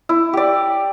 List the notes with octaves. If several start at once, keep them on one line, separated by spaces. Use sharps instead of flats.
E4
G4 D5